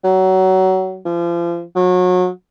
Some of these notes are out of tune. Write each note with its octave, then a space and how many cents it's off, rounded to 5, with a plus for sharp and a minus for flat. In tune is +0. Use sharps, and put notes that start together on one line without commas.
F#3 +25
F3 -35
F#3 -30